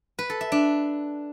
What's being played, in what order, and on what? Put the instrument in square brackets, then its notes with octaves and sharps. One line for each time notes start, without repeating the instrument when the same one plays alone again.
[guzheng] B4
A4
E5
D4